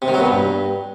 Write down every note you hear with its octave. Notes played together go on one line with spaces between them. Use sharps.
C3
D#3
F#3
B2
G2